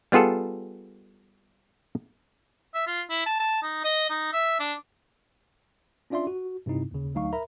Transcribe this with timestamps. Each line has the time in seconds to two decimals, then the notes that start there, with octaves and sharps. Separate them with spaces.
0.12 G3 B3 F4 G#4 A4
2.74 E5
2.87 F4
3.10 E4
3.26 A5
3.40 A5
3.63 D#4
3.84 D#5
4.10 D#4
4.33 E5
4.59 D4
6.10 C#4 D4 F4 D5 E5 C6
6.27 F#4
6.66 G2 C3 C4 D#4 E4
6.91 D#2 C#3
7.15 D2 F#3 D#4 F5 C#6
7.33 A#4 E5 A#5 B5